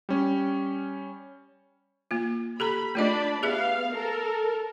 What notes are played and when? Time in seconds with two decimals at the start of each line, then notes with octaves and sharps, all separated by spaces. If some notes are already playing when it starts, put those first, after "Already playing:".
0.09 G3 C#4
2.11 A#3 F4
2.60 G4 A4 A#5 B5
2.95 A3 D4 F4 D5 D#5 B5
3.43 B3 G4 G#4 E5 F5
3.94 A4 A#4